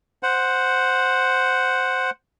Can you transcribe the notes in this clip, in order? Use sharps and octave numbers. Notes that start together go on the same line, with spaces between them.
C5 F#5